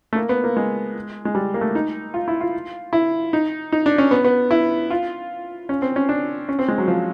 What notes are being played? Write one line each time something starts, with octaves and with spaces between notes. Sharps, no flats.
A3
A#3
B3
A#3
G#3
G#3
G3
A#3
A3
D#4
F4
E4
F4
E4
D#4
D#4
D4
C#4
B3
B3
E4
F4
C#4
C4
C#4
D4
C#4
C4
G#3
F#3
F3